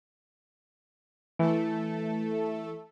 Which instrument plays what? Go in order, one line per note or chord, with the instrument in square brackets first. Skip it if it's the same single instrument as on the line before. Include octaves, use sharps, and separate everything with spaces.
[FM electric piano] E3 [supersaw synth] A3 A4